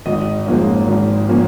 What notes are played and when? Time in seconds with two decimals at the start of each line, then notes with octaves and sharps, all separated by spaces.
0.06 G#1 D#5
0.46 G#2 F3 A#3 C#4
0.87 G#1
1.29 F3 A#3 C#4